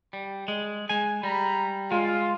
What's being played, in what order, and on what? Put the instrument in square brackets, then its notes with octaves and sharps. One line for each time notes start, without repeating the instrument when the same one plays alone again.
[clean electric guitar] G3
G#3
G#3 G#5
[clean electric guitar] G3 [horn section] A#5 B5
[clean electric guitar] G#3 [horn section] F4